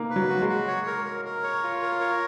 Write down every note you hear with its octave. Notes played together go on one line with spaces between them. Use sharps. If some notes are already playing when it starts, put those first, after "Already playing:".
Already playing: A#3 D#4
B4
F#3
F#4
G#3
F#4
C#5
A#4
A#4
A#4
C#5
F4
A#4
C#5